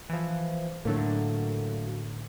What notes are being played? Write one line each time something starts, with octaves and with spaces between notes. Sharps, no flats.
E3 F3
A2 D3 F#3 A3 A#3